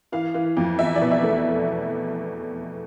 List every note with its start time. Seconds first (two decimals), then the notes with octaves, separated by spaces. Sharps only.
0.12 E3 F5
0.34 E3
0.57 F2
0.79 E2 E5
0.96 D5
1.01 B2
1.11 E5
1.23 A3